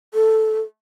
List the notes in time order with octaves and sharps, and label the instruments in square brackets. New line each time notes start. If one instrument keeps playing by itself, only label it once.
[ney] A4